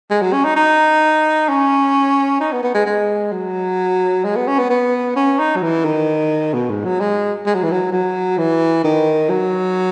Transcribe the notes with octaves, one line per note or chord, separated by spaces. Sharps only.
G#3
F#3
C#4
D#4
D#4
C#4
D#4
B3
B3
G#3
G#3
F#3
G#3
B3
C#4
B3
B3
C#4
D#4
F#3
E3
D#3
B2
G#2
F#3
G#3
G#3
F#3
E3
F#3
F#3
E3
D#3
F#3